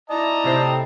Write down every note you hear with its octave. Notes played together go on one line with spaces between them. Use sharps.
E4 D5 D#5 A5 A#5
A2 C3 C4